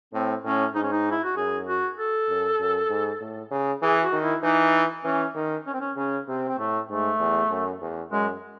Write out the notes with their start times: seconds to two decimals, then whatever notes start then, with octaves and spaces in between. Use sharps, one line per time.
0.13 A2 C4
0.44 A2 C#4
0.74 G#2 D#4
0.83 C#4
0.92 D#4
1.11 E4
1.24 F#4
1.36 F#2 G#4
1.67 F#4
1.98 A4
2.29 F#2
2.60 F#2
2.90 G#2
3.21 A2
3.51 C#3
3.82 E3 G#4
4.02 F#4
4.12 D#3
4.23 E4
4.43 E3 D#4
5.05 E3 C#4
5.35 D#3
5.66 C#4
5.74 C4
5.80 C#4
5.96 C#3 C#4
6.27 C3 C4
6.48 C4
6.58 A2 A3
6.89 G#2 A3
7.20 E2
7.51 F#2
7.81 E2
8.12 F#2 G#3